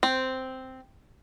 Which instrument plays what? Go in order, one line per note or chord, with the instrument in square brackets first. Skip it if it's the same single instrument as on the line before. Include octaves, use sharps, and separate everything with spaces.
[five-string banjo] C4